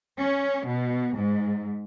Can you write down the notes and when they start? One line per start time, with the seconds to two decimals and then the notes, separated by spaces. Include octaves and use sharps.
0.20 C#4
0.67 B2
1.16 G#2